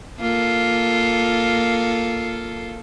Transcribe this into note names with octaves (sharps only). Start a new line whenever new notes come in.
A#3 F4 A4